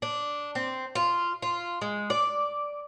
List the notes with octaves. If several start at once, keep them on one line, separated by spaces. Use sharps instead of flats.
D4
C4
F4
F4
G#3
D5